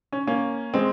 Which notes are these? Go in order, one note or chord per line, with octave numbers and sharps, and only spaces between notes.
C#4
A#3 C#4
G#3 C4